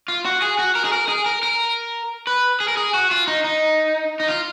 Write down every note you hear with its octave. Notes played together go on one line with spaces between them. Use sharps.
F4
F#4
G#4
F#4
A#4
G#4
A#4
G#4
A#4
A#4
B4
G#4
A#4
G#4
F#4
F4
D#4
D#4
D#4
F4